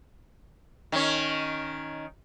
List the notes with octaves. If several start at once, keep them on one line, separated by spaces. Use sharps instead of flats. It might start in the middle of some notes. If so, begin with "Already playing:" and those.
D#3 C#4